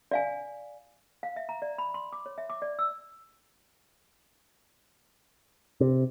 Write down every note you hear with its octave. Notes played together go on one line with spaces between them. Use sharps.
D5 F5 G#5
F5
E5
A#5
D5
B5
C6
D6
C#5
E5
D6
D5
E6
C3